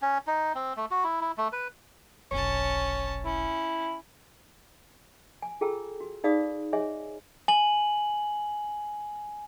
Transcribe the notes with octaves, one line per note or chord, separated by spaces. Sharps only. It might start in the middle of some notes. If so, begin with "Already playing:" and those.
C#4
D#4
C4
A3
F#4
E4
E4
A3
B4
F1 B1 C#4 C#5 A5
C#4 E4
G#5
F4 G#4 A4 G5 A#5 E6
F#4
D#4 G#4 D5 F5 B5 D#6
G#4 C#5 D#5 E5 G#5
G#5 F#7